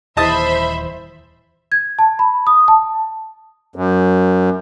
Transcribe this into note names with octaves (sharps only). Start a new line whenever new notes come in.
D#1 E3 C5 D#5 E5 A5 B5 D#6
G#6
A5
B5
D#6
A5
F#2